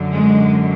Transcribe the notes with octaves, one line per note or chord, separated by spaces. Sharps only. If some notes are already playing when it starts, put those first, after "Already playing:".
Already playing: F#2 D3
G#3